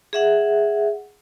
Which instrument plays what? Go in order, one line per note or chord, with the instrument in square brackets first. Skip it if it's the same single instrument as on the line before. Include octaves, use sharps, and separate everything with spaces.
[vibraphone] G#4 E5 F#5